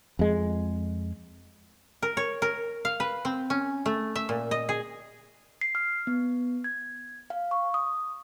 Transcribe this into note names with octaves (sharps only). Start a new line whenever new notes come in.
F2 G#3
A#4
C#5
A#4
F5
B4
C4
C#4
A3
E5
A#2
D#5
G#4
C7
F6
B3
G#6
F5
C#6
D#6